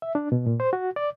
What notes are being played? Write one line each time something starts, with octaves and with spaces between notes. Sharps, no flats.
E5
D4
B2
A#2
C5
F#4
D5